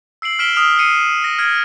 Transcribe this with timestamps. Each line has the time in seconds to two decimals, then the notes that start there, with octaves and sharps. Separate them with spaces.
0.22 E6 C7 D7 F#7
0.39 F6 B6 D7 E7 G7
0.56 D#6 F6 F7
0.78 F6 C7 C#7 D#7
1.22 A#6 D7
1.38 F6 G#6 A#6 D7